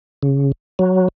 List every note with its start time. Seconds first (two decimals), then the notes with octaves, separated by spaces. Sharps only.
0.23 C#3
0.79 F#3